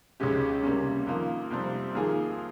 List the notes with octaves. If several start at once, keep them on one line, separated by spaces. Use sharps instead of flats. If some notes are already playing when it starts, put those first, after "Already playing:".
C#2 C#3 G#3 C#4 G4
C3 G3 A#3 C#4
F2 D#3 A#3 F4
F2 C3 G3 C4
F2 D#3 A#3 F4 G#4